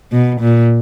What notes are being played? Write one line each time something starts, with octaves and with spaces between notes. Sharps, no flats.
B2
A#2